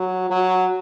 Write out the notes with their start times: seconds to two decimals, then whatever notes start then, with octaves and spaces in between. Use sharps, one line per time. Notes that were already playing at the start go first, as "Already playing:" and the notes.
Already playing: F#3
0.30 F#3